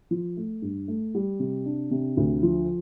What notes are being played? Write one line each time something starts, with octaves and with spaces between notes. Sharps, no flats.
F3
A3
G2
A3
G3
C3
D4
C3
D2
F3